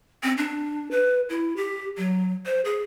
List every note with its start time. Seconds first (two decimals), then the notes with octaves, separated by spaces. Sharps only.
0.23 C4
0.38 D4
0.91 B4
1.30 E4
1.56 G4
1.97 F#3
2.46 C5
2.65 G#4